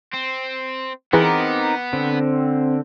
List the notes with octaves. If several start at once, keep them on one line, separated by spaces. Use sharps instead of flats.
C4
E3 B3 C4 D#4 G#4 A#4 D6 F#6
D3 C4